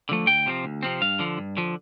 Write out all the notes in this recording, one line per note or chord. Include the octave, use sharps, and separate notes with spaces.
D3 F3 A3
D2 G5
C3 F3 C4
D2
C3 F3 C4
G2 F5
D3 F3
G2
D3 F3